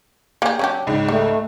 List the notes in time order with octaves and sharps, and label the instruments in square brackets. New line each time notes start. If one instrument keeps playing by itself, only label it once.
[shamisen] A#3 G#4 [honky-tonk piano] G4
[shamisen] F#3 D4 G4 [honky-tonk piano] C#4
[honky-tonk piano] C#2 G#2 C#3
[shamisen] G3 [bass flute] A3